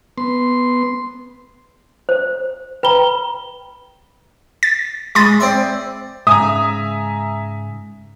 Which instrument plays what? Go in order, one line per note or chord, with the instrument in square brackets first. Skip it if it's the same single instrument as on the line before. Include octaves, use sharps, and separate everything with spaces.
[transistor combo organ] B3 C6
[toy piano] C5
[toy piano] B4 A#5 [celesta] G5 B5 G7
[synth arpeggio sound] A6
[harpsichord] G#3 B5 D#6 [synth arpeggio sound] C6 A6
[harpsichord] C4 D5 E5
[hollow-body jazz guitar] G#2 C#3 [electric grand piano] E5 G#5 A#5 [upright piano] D#6